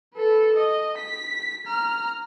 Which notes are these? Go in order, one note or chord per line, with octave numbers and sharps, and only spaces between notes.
A4 B4
D#5
B6
A#5 F6